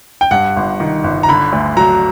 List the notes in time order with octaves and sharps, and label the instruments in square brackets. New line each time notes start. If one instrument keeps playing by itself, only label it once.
[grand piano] G5
G2 F#5
G1
D#3
G1
A#5
D3 B5
D2
F#3 A#5